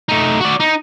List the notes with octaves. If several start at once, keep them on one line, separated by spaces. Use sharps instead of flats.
A3 D#4
F#4 D5
D#4